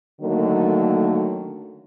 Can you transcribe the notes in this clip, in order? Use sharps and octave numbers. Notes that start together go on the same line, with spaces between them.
D3 D#3 F#3 A3 A#3